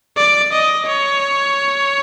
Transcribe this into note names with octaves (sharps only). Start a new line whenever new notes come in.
D5
D#5
C#5